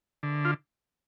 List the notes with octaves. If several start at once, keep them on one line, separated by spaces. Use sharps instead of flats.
D3
F4